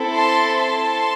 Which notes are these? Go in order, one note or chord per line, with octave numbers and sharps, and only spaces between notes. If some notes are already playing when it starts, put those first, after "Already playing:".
Already playing: C4 E4 A4
A5 C6
A5 C6